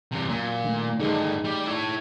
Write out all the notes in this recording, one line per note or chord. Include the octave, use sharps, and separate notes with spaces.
G2 C3
A#2 F#3
D#3 A3 D4
G2 D3 D#4 G#4
G3 D5
E4 C#5